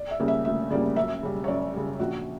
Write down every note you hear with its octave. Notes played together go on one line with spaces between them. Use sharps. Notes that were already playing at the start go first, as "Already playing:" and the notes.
Already playing: D5
E5
C#3 G3 A#3
E5
D2 E5
C#3 G3 A#3 D5
F#2 E5
C#3 G3
C#5
F#2 D5
C#3 G3
A#1 F#4